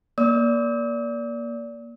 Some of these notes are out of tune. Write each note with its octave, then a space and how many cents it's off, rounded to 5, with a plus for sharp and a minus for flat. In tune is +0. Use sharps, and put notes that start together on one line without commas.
A#3 +20 D5 -20 E6 -45